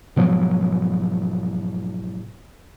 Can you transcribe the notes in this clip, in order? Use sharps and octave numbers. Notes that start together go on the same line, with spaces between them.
G#2 B2 F3 F#3